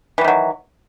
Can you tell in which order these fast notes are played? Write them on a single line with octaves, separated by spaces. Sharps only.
E3 G3 D#3 F#3